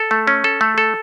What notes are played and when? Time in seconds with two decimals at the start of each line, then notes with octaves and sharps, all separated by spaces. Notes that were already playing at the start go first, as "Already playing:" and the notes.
Already playing: A4
0.11 A3
0.27 C#4
0.44 A4
0.61 A3
0.78 A4